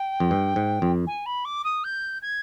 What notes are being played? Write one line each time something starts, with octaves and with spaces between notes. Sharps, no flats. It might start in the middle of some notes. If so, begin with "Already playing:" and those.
Already playing: G5
F2
G2
G#2
F2
G#5
B5
D6
D#6
G6
G#6